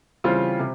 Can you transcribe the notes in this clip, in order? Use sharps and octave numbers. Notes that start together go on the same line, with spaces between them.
C#3 E3 G3 C4 F4
C3